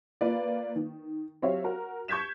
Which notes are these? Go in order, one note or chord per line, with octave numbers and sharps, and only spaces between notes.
A#3 F4 B4 D5
D#3
F#3 C4 G4 C#5 E5 F5
F#4 A#4
C#6 G6 G#6 B6 E7